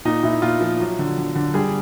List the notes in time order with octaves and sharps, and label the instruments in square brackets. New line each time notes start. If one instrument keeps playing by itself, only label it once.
[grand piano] A#2 D#4
A#2 E4
A#2 F4
F3
F#3
D3
D3
D3
G3 G#4